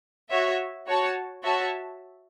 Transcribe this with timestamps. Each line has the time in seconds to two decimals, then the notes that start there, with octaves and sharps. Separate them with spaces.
0.30 F#4 C#5 E5
0.87 F#4 C#5 A5
1.43 F#4 C#5 E5 A5